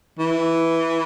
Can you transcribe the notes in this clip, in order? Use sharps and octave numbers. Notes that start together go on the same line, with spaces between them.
E3